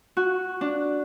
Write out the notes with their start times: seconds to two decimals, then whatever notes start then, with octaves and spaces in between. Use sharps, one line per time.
0.17 F#4
0.61 D4